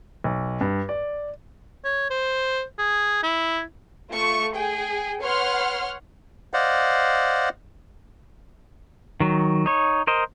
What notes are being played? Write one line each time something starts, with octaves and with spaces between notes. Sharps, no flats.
B1
G2
D5
C#5
C5
G#4
E4
A3 F4 C#6
G#4 G5
B4 C#5 F#5 C6 F6
C5 D5 D#5 F5 F#5
D#3 F#3
D#4 C#5
A#4 C5 D#5